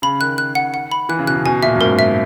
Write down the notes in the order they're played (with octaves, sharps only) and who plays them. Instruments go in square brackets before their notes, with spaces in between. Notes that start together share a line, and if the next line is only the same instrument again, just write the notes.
[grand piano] C#3 [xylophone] B5
[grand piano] D#3 [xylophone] F#6
[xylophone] F#6
F#5
F#5
B5
[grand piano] E3 [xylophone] F#6
[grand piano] C#3
[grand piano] B2 [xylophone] F#6
[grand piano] C#3
[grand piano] B2 [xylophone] G#5
[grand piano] A#2 [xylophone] E5
[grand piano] F#2
[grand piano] G#2 [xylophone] A#4
[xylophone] E5